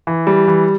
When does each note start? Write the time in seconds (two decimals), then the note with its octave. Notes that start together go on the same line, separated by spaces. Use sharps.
0.07 E3
0.27 G3
0.48 E3